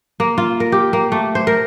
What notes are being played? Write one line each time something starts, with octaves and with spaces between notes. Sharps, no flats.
A#3
F4
A#4
G4
A#3
A3
C5
A#4